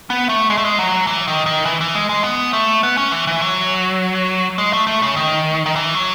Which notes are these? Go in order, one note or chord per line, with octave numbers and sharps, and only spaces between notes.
B3
A3
G#3
A3
G#3
F#3
E3
D#3
D#3
E3
E3
G#3
G#3
B3
A3
B3
C#4
E3
E3
F#3
G#3
A3
A3
C#3
D#3
D#3
E3
F#3